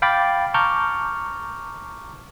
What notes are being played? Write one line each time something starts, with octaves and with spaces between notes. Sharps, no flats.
F5 G5 B5 D6 A6
A5 A#5 C#6 D6 F6 G6